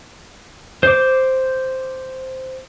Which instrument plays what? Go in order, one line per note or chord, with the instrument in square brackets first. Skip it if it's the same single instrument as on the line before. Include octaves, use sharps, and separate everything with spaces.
[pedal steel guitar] C5 D6